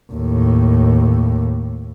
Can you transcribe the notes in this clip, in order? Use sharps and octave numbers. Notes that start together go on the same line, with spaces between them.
D#2 A2